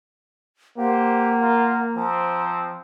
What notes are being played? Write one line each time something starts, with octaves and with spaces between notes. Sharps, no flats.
A#3 G4 C5 F#5
F4 A#4
F3 C4 A#5